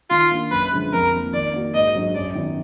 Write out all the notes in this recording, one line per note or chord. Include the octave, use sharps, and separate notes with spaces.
D#3 F4
A#3 D4
F#2 B4
D3 F3 G#3
F2 A#4
F3 A#3
D#3 D5
A#3 D#4 F#4
G#2 D#5
F#3 D4 F#4
F#2 D5
D#3 F#3 B3 D#4